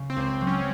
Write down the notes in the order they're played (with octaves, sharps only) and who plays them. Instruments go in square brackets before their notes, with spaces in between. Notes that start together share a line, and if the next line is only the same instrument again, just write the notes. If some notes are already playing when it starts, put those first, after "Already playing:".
Already playing: [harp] C#3
[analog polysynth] C4
[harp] C#2
[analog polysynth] C4
[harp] F#3
[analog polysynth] C#4